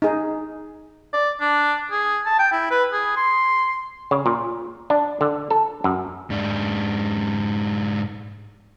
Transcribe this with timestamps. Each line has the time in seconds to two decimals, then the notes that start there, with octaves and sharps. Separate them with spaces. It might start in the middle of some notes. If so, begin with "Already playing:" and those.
0.02 D#4 G#4
1.13 D5
1.41 D4
1.91 G#4
2.26 A5
2.39 G5
2.52 E4
2.71 B4
2.92 G#4
3.17 C6
4.11 C#3
4.26 A#2
4.90 D4
5.21 D3
5.51 A4
5.84 F#2
6.30 G#2 D4